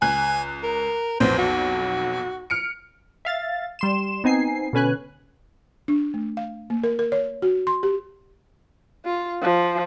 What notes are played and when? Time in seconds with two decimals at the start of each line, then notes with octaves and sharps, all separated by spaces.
0.02 C#2 G#5 F#6
0.63 A#4
1.20 B1 F2 B3 C5
1.38 F#4
2.50 F6 C#7 D7
3.25 E5 F5 A6
3.79 G3 C6 E7
4.24 B3 C4 D#4 G#5 C7
4.73 B2 D3 C#4 B4 G#5 F#6
5.88 D4
6.14 A3
6.37 F5
6.70 A#3
6.84 A#4
6.99 A#4
7.12 C#5
7.42 F#4
7.67 C6
7.83 G4
9.05 F4
9.42 F3